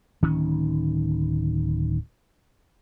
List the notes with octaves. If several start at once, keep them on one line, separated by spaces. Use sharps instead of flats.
D1 D#3 C#4